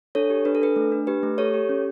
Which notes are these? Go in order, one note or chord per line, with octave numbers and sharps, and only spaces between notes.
D4 A4 C#5
G4
D4 B4
A4
D4 B4
A3
D4
G4 B4
A3
G4 A4 C#5
G4
C#4